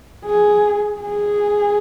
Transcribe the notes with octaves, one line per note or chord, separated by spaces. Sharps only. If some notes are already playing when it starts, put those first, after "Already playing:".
G#4
G#4